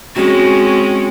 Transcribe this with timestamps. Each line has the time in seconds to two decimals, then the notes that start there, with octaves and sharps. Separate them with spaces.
0.16 G#3 C4 C#4 F#4